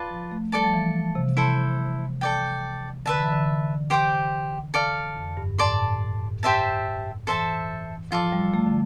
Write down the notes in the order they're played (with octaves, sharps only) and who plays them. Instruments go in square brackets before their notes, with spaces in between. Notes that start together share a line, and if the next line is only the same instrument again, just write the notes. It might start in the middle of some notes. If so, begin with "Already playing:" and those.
Already playing: [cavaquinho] F4 B4 D5 A5
[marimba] F3
A3
[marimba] G3 [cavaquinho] A4 D5 A5
[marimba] F3
E3
C3
[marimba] C3 [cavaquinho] E4 A4 C5
[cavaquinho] A4 D5 G5
[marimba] D3 [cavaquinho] B4 E5 A5
[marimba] E3
D3
[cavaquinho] G4 C5 G5 D6
A4 D5 F5
[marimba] F2
G2
[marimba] A2 [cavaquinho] D5 A5 C6
[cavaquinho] G4 C5 E5 A5
[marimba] E3 [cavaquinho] A4 C5 E5 A5
[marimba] F3 [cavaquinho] F4 A4 D5
[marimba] G3
A3
D3